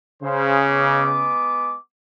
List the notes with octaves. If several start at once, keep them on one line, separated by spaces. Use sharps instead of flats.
C#3 C5
G#3 B3 D6